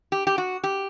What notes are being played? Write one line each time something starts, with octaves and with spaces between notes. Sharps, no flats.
G4
G4
F#4
G4